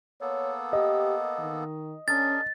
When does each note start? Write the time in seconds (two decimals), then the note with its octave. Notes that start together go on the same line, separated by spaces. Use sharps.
0.21 A#3 B3 A4 C#5
0.73 G4 D#5
1.39 D#3
2.08 C#4 D4 G#4 A#4 A6